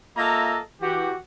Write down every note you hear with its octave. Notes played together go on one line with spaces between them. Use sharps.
A#3 F4 A4 D#5 E5 A#5
E3 F#4 G4